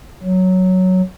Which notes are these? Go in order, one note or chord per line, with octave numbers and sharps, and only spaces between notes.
F#3